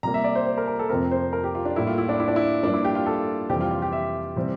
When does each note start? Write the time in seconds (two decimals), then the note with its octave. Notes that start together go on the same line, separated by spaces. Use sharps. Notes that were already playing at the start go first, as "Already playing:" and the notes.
0.03 C3 G3 A#3 A#5
0.14 E5
0.24 D5
0.35 C5
0.46 C5
0.58 A#4
0.68 A#4
0.79 A4
0.89 F2 C3 F3 A3 C4 A#4
1.11 C5
1.33 A#4
1.44 G4
1.55 F4
1.65 D4
1.76 A2 G3 A#3 E4
1.87 F4
1.98 E4
2.09 D4
2.20 E4
2.28 D4
2.36 E4
2.63 G2 F3 A#3 D4
2.74 E4
2.85 G4
2.95 F4
3.06 A4
3.50 F2 C3 E3 G3 C4 G4
3.61 F4
3.71 F4
3.82 G4
3.93 E5
4.36 C3 E3 G3 C4